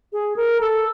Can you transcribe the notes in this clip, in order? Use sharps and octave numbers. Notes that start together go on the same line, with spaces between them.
G#4
A#4
A4